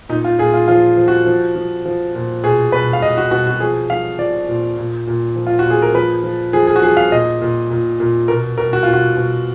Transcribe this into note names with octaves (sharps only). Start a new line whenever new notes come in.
A#2 D#4
F4
A#2 G#4
F4
F3 F4
F3
F#4
F3
F3
F3
A#2
B2 G#4
B2 B4
F5
B2 D#5
F#4
B2 F#4
F#4
F3 G#4
F3 F5
F3 D5
A#2
A#2
A#2
F3
F4
F#4
A#2 G#4
A#4
F3 B4
F3
F3 G#4
G#4
F#4
F3 G#4
F5
A#2 D#5
A#2
A#2
A#2
B2 A#4
B2 A#4
F#4
B2 F4
F#4
B2